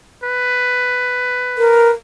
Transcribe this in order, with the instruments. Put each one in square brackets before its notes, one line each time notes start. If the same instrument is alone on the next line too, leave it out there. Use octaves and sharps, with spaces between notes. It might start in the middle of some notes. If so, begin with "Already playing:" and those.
[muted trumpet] B4
[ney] A#4